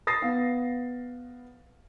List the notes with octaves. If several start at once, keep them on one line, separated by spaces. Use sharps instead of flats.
D#6 A6 A#6 C7
B3 F5